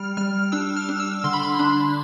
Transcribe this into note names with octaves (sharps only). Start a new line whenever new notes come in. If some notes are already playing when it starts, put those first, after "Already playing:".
Already playing: G3 F6
G3 F6
D4 E6
F6
D4
E6
D3 C6
B5
C6
D4 B5